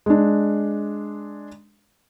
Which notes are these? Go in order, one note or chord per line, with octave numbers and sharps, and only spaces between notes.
G#3 D4